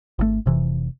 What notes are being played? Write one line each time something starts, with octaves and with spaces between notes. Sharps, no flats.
G#1 C3 A3
F1 C3 E3